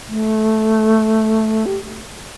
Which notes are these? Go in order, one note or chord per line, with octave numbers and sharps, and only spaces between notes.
A3
G4